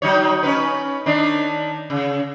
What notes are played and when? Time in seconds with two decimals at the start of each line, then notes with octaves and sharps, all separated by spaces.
0.02 F#3 D#4 C#5
0.43 C#4 D#4 B4
1.06 D#3 D4 D#4
1.90 C#3